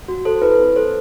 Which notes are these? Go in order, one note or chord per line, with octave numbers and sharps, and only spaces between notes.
F#4
A4 C5
E4 B4
C4
A4 C5